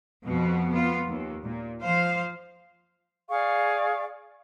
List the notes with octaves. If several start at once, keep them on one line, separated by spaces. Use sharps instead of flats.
F2 B2 B3
B3 F4
D#2
A#2
F3 C5 F5
G#4 D5 F5 C#6